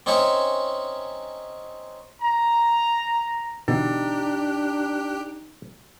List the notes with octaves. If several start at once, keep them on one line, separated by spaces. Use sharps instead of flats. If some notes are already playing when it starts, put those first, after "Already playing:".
C4 C#4 D#4 C#5 E5 G#5
A#5
B2 D3 E3 D4 D#4 G4